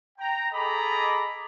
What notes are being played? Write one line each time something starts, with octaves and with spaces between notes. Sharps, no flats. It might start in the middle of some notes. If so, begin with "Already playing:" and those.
G5 A#5
G#4 A4 D#5 A#5 B5 D6